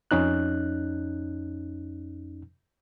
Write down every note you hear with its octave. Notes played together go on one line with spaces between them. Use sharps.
F2 C#4 D#4 F#6